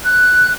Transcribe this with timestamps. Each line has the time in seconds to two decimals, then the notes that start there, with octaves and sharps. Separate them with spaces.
0.05 F#6